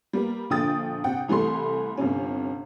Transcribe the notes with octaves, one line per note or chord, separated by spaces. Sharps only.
G3 A#3 B3
A#1 D3 G5 D#6 A6
C3 F#5 G5
C2 E3 G3 A3 C6
G1 C3 C#4